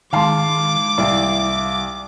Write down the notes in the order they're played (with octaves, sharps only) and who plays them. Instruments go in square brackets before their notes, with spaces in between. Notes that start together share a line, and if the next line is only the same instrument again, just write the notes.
[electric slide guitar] D#3 G#3 [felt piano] F5 A5 C6 [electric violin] D6
[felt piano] C2 [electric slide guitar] E4 D5 F5